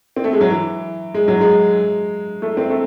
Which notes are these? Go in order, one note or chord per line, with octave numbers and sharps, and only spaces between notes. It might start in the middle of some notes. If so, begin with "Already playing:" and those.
C4
A3
G#3
F#3
E3
G#3
F#3
G#3
A3
C4
A3